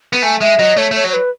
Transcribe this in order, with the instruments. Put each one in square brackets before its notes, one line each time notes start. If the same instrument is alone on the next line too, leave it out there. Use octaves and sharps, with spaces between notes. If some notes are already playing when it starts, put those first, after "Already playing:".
[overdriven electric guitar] B3
[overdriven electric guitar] A3 [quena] G#5
[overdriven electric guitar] G#3 [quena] E5
[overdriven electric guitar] F#3 [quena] D#5
[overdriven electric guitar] A3 [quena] C#5
[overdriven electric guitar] A3 [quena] C#5
[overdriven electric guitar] F#3
[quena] C#5
B4